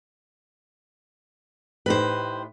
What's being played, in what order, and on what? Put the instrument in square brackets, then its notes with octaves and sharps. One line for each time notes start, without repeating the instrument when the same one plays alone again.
[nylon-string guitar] A2 D#4 G4 [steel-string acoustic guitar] B4 C5